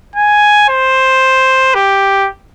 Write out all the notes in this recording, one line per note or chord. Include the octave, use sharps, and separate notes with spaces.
G#5
C5
G4